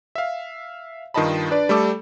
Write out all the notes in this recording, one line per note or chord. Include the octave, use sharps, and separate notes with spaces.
E5 F5
G2 D#3 F4 D#5 A5 B5
D4 B4 D5
G3 A3 A4 D6